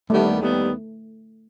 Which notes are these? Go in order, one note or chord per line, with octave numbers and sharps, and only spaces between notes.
D#2 D#3 G3 A3 B3
D#2 D#3 G3 B3